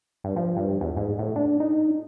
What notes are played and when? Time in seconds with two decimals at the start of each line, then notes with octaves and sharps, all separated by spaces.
0.24 G2
0.36 F3
0.57 G2
0.81 E2
0.97 G#2
1.19 A2
1.36 D4
1.60 D#4